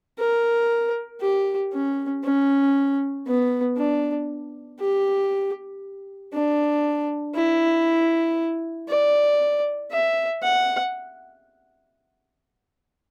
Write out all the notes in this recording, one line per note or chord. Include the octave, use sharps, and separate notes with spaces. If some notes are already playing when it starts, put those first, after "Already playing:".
A#4
G4
C#4
C#4
B3
D4
G4
D4
E4
D5
E5
F#5